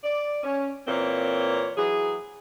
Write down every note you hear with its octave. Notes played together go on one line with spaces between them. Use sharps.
D5
C#4
A#2 E3 A#3 C4 C#5
E3 F#3 G#4